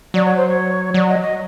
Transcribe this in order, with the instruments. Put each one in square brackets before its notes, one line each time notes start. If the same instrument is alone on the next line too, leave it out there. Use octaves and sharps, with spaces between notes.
[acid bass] F#3 [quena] D5
[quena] C#5
C5
C#5
[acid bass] F#3 [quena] D5
[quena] D#5
D#5